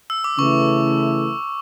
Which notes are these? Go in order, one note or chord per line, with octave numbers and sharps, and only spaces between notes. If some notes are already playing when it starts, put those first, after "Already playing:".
E6
D6
C#3 E3 A3 E4 C#6